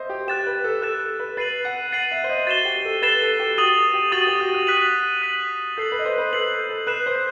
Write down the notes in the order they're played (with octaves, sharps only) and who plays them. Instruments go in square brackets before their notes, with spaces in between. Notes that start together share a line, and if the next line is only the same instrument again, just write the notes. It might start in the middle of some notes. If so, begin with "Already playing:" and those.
Already playing: [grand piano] C5 D#5 E5
G4
[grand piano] G4 [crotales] F#6 A6 E7
[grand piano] B4
A4
[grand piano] A4 [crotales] F#6 A6 E7
[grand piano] B4
[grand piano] B4 [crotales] A6 C7 D#7 F#7
[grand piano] F#5
[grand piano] F#5 [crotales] A6 C7 D#7 F#7
[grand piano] E5
C5
D#5
[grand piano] F#4 [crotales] A6 C7 E7 G7
[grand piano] G4
A4
[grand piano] B4 [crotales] A6 C7 E7 G7
[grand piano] A4
G4
[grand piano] F#4 [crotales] D#6 A6 D#7 F#7
[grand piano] G4
[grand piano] F#4 [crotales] D#6 A6 D#7 F#7
[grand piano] G4
F#4
F#4
[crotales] F#6 B6 D#7 F#7
F#6 B6 D#7 F#7
[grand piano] A4 [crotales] G6 C7 F#7
[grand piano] B4
D#5
C5
B4
[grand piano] A4 [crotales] G6 C7 F#7
[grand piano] A4
[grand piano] B4 [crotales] F#6 C7 E7
[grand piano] C5